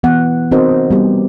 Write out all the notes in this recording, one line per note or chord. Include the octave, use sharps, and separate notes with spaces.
E3 B3 F#5
C4 D#4 F#4 A#4 C5 D#5
G3 B3 G4